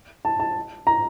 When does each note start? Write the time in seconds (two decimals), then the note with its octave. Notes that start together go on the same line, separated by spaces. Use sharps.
0.25 A5
0.40 A5
0.87 A#5